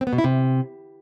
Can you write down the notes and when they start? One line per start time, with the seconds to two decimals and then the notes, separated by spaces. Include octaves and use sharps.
0.01 C4
0.07 B3
0.13 B2
0.18 E4
0.24 C3